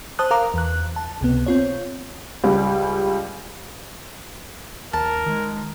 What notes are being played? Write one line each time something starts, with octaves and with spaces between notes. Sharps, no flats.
C5 A5 D#6 F#6
A#4 F5 A#5 D6
E2 F#6
A5
C#2 C3 B3
C4 F4 C#5
C#2 G3
D#2 A#4 A5
D#3 G#3